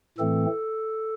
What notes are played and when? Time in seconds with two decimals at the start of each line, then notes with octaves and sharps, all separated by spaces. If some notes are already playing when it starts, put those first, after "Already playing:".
0.18 A2 E3 A3 C4 A4